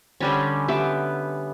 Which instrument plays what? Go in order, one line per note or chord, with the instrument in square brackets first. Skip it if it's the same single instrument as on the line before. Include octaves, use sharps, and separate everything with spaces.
[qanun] D3 G3 C#4
[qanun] B3 [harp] G4 E5